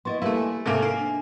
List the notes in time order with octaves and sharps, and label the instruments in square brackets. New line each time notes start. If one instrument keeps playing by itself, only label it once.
[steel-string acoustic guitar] B3 E4 D#5 [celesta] C6 C#6 A6
[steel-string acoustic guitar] G3 A#3 B4 [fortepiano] A3 E4 [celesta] F5
[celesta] G#5
[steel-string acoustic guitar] G#2 G#5 [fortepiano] C3 A3 A#3 [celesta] A4 E5
[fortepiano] A#3 [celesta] C7 D7
[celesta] D4